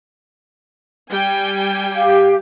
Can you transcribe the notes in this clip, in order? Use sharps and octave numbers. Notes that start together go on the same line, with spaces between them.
G3 G5 G#5
G4 F5